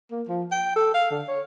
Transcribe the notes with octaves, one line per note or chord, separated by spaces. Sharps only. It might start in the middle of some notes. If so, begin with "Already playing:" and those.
A#3
F3
G5
A4
F5
D3
C#5